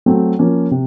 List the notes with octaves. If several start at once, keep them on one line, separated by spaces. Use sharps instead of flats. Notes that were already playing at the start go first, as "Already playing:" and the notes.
F#3 A3 C4
F3 A#3 C#4
C3